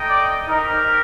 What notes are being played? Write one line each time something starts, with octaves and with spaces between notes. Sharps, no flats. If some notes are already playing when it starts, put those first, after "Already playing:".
Already playing: A3 D#4 A4 D#5 G5
D5
C4 D#4 G4 A#4